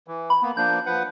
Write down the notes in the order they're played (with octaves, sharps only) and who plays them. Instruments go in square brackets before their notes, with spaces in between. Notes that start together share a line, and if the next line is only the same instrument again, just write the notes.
[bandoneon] E3
[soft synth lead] B5
[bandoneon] A#3 B3
[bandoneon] F3 A#3 D4 [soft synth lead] G6
[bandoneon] F3 B4 F#5